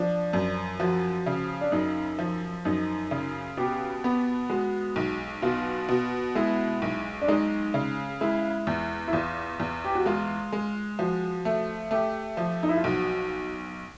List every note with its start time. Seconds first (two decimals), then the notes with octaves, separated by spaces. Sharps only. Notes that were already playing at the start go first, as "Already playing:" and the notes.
Already playing: F3 D4
0.33 F#2
0.80 F3 F#4
1.26 C#3
1.61 D4
1.72 F#2 D#4
2.18 F3
2.65 F#2 D#4
3.11 C#3
3.57 B2 G4
4.04 B3
4.50 G#3 F#4
4.96 B1
5.42 B2 F4
5.89 B2
6.35 G#3 E4
6.82 B1
7.22 D4
7.28 G#3 D#4
7.74 C#3
8.21 G#3 E4
8.67 E2
9.08 E4
9.13 E2 F4
9.60 E2
9.84 G4
9.95 F#4
10.06 G#3 F4
10.52 G#3
10.99 F3 F#4
11.45 A3
11.91 A3 G4
12.37 F3
12.63 D#4
12.69 E4
12.77 F4
12.84 B1 F#4